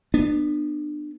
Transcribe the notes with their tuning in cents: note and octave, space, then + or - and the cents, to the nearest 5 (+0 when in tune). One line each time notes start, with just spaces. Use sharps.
B3 +0 D4 +30